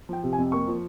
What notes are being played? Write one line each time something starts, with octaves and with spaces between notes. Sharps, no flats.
F3 G5
C3
G#5
F2
A#3 C#6
F3